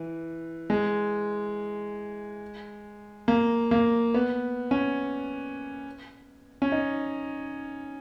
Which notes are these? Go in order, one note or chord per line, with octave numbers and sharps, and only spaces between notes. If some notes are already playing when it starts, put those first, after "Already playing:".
Already playing: E3
G#3
A#3
A#3
B3
C#4
C#4
D#4